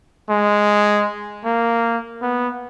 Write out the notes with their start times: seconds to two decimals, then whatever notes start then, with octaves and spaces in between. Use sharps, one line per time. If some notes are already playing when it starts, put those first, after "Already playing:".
0.29 G#3
1.45 A#3
2.22 B3